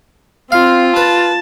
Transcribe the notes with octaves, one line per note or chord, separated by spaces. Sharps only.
C4 F4 F5
B4 A5